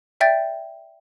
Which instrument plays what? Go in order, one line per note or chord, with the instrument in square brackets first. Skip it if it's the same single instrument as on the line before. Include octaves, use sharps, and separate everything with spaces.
[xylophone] D5 E5 G5 G6 A6